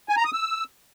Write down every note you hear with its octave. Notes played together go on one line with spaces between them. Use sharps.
G#5
A#5
D#6
E6